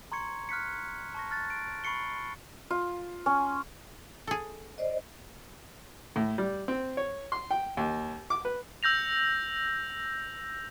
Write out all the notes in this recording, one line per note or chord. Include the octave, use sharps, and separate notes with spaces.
A#5 C6 C#6 G#6 C#7
F6 F#6 B6 C#7
A5 C#6 A#6
F6 F#6 A6
D7
B5 C#6 C7 C#7 G7
F4
C#4
G#4 A4
C5 D5 D#5
A2
G3
C4
C#5
C6
G5
D#2
D6
B4
E6 G6 A#6 F7